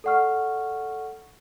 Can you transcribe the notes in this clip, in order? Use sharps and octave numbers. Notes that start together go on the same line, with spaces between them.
A4 D5 F#5 C#6 F6